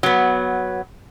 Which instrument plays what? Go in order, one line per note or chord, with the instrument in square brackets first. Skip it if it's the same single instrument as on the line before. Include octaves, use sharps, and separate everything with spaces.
[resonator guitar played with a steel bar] F#3 B3